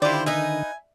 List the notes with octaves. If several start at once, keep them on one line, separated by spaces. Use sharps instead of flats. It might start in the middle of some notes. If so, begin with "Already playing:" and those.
D3 D#3 E4 F4 G4 C5 D5
D#4 B4 D#5 E5 G#5